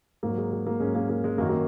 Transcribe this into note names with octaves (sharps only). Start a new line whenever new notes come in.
G#2 F#3 A#3
G#3
G#3
A#3
G#2 F#3 G#3 C#4
A#3
A#3
G#3
F#2 D#3 F#3 A#3
A#3